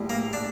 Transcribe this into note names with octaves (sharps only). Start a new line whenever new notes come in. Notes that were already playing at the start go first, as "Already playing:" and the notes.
Already playing: A#1 A2 G3
A#3
D4